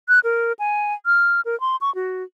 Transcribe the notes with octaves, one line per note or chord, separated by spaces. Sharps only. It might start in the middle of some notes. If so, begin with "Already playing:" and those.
F#6
A#4
G#5
F6
A#4
C6
C#6
F#4